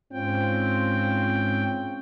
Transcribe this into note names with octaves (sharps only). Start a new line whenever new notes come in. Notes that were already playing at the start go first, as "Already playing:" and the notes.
G#2 C4 C#4 F4 G5